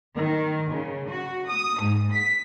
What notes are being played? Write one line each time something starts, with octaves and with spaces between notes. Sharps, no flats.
D#3
C#3
F#4
D#6
G#2
B6